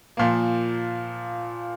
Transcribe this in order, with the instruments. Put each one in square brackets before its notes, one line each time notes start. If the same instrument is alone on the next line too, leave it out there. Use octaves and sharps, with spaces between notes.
[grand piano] A#2 F3 A#3